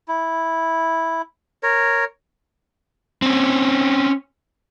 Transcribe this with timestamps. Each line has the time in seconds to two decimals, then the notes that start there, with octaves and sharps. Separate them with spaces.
0.08 E4
1.63 A#4 C#5
3.22 C4 C#4